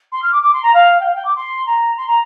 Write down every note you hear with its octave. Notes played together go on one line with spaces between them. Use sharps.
C6
F6
D6
D6
C6
A#5
F5
G5
F5
G5
D6
C6
A#5
C6
A#5